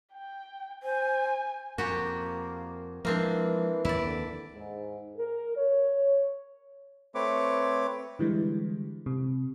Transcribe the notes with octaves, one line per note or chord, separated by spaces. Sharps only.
G5
C5 G#5
F2 A#3 F#4 G4
E3 F3 G#3 A#3 C4 D4
D#2 E4 D5
D3
G#2
A#4
C#5
A3 C4 B4 C#5 D6
D3 E3 G3 G#3
C3